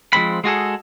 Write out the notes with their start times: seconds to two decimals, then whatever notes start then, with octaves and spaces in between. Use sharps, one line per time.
0.13 F3 G#3 C4 B5
0.44 G#3 F#4 G#4 A4